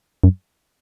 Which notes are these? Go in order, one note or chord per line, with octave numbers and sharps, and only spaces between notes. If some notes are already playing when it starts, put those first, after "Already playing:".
F#2